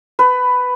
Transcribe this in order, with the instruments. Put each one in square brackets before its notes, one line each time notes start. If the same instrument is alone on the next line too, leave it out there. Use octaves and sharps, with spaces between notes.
[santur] B4